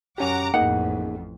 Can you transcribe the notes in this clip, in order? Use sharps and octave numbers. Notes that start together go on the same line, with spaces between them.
F#2 C#4 G4 F#5 A#5 D6
A1 F2 A#3 D#4 G#4 F#5